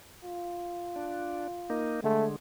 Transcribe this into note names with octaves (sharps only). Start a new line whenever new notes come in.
F4
D4
A#3 D#4
D3 G#3 A3